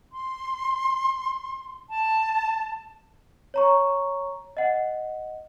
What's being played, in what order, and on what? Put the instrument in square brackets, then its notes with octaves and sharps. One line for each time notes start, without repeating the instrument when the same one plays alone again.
[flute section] C6
A5
[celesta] C#5 A#5 C#6
D#5 F#5